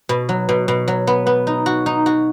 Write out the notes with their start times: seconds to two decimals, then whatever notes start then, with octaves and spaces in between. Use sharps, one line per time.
0.09 B2
0.29 F#3
0.49 B2
0.68 B2
0.88 F#3
1.07 B3
1.27 B3
1.47 D#4
1.66 F#4
1.86 D#4
2.06 F#4